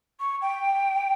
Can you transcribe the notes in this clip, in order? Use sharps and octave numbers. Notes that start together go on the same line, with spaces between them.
C#6
G5